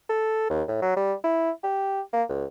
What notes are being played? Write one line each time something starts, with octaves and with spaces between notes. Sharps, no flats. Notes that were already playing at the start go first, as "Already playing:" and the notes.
A4
D#2
A2
F#3
G3
E4
G4
A#3
C#2